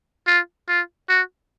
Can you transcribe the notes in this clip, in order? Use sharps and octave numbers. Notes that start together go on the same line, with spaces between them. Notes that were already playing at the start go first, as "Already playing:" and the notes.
F4
F4
F#4